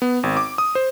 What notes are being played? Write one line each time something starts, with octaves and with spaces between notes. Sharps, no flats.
B3
G#1
D6
D#6
C5